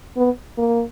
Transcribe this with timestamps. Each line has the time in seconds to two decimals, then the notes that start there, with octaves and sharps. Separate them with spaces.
0.17 B3
0.58 A#3